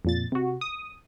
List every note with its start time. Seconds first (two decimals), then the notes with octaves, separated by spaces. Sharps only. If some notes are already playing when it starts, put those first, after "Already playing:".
0.05 F2 A#2 A6
0.32 C3 F#4
0.61 D#6